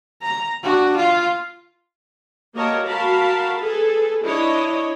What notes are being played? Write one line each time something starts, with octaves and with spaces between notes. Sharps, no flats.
A#5
D4 F#4
F4
A#3 F#4 A#4 C#5 D#5 A5
F#4 A#4 F5 A5 B5
G#4 A4 B4
D4 E4 C#5 D#5